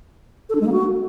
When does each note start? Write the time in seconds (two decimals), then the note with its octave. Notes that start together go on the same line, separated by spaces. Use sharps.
0.49 A4
0.55 D4
0.61 G#3
0.67 A#3
0.72 F#4